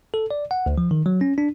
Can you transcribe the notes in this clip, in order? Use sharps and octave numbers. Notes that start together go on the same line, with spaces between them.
A4
D5
F#5
D2
F3
D#3
F#3
C#4
D4